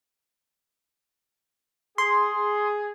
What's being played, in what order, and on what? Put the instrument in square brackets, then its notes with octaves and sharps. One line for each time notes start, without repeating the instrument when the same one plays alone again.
[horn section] G#4 [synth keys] C6